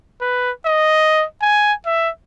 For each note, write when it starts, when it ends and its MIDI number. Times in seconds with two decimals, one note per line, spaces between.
0.21 0.51 71
0.66 1.25 75
1.41 1.73 80
1.86 2.09 76